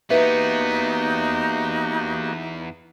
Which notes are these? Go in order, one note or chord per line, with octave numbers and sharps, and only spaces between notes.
E2 A#3 B3 D#4 F#4 G4 B4 E5